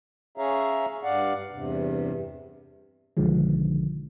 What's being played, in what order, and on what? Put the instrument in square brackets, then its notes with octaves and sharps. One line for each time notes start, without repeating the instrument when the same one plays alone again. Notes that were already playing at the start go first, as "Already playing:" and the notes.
[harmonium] C#4 G#4 C#5 E5 F5 A#5
G2 D5 F5 F#5
E2 G2 C3
[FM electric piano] B1 D3 D#3 F3 G#3